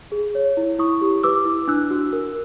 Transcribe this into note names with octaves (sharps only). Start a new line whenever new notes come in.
G#4
C#5
E4
E4 C#6 D#6
G4
B4 D6 E6
E4
D4 E6 F#6
F#4
A#4